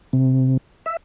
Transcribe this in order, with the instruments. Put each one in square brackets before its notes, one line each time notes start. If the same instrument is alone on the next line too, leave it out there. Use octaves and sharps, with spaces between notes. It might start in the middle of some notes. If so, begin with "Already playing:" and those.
[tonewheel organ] C3
E5